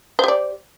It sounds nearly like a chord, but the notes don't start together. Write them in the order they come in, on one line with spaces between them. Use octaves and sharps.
C5 G4 D5